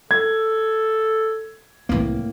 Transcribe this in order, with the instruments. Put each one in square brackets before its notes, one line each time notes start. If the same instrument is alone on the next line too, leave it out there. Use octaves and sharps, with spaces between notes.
[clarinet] A4 [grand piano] G#6
[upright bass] C2 E3 [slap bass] A2 A#3